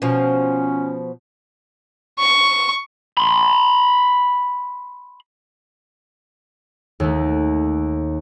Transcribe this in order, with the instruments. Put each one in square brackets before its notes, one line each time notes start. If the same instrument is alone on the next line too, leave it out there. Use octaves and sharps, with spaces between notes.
[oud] B2 F3 [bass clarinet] C#4
[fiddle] C#6
[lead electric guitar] B5 C6
[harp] D#2 A3